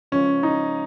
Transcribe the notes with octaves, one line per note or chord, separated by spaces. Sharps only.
C#2 C#3 F3 C#4
D#4